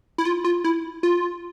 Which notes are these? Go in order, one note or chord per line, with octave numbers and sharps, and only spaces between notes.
E4
F4
F4
E4
F4